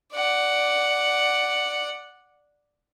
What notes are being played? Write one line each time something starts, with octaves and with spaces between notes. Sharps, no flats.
D5 F#5